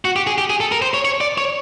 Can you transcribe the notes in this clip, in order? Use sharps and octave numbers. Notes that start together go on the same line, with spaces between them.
F#4
G4
G#4
G4
G#4
A4
A#4
C5
C#5
C#5
D5
C#5